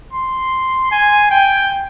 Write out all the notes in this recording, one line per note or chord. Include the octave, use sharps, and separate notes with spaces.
C6
G#5
G5